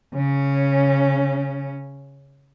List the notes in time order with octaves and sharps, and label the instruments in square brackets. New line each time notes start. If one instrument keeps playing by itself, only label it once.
[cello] C#3 C#4